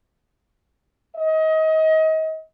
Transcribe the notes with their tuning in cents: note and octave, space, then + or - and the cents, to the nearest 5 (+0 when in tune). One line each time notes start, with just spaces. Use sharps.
D#5 +30